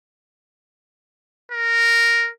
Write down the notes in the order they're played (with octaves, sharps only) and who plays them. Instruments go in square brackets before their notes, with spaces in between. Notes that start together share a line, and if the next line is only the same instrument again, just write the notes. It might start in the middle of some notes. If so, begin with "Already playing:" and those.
[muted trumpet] A#4